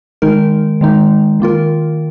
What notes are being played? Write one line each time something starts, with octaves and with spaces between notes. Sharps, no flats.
D#3 G#3 D#4 A#4
D#3 G#3 D#4
D#3 A#3 F4 A#4